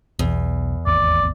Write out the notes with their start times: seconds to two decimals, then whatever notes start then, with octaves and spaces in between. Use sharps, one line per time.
0.19 B1 E2
0.86 G#1 D#2 D5